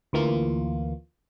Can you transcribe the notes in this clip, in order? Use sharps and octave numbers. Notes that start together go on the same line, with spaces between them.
D2 E3 A#3 F4